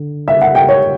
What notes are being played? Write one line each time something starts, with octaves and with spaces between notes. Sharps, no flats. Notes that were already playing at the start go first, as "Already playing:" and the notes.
Already playing: D3
E5
F#5
G5
C#5